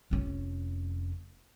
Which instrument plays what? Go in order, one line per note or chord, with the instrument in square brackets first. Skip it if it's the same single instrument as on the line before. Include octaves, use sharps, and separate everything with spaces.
[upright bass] F1 C#4